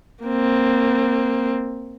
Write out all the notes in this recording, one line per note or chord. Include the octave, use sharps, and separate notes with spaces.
A#3 C4